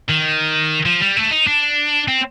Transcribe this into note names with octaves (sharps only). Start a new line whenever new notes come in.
D#3
F3
G3
A3
D#4
D4
C4